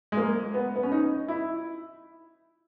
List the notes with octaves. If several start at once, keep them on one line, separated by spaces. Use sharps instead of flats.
G#3
A#3
B3
B3
C#4
D#4
E4